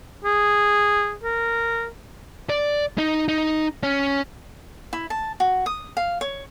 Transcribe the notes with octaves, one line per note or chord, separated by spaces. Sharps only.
G#4
A#4
D5
D#4
D#4
C#4
E4
A5
F#4
D#6
F5
C#5